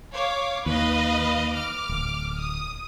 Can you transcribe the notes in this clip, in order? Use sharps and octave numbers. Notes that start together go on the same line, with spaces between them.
C#5 F5 D6
D#2 B4 D#5 F5
D6 F6
D1
D#6